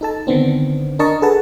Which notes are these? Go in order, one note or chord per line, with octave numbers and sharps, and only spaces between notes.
D#4 A4 A5
D3 D#3 B3 C4 D4
D4 A#4 D#5 A5 C#6
G#4 A4 B4 F#5 A5